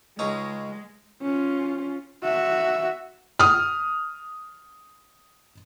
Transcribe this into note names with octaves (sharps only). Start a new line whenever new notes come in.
C#2 G#3 C#4 D#4
C#4 F4
F#4 E5
D#6 F6